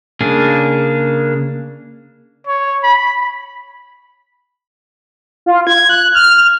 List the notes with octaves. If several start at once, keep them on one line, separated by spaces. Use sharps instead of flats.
C#3 A#3 D4 G#4
C#5
B5
F4
G#6
F#6
F6